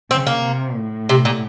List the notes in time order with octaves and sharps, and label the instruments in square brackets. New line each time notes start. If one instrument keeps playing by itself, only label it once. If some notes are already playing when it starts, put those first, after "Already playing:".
[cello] C#3 [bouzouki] C4
[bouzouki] A#3
[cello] C3
A2
[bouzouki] C3
A#2